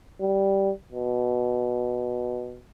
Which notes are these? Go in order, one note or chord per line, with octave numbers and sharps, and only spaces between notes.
G3
B2